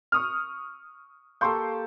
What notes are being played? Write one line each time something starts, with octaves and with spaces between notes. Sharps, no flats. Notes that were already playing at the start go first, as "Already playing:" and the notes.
C#6 D#6 F6
A#3 G4 A4 C6 C#6 G6